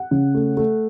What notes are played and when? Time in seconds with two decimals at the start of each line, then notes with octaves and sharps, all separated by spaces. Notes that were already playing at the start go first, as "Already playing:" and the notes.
Already playing: F#5
0.11 C#3
0.35 A3
0.57 A3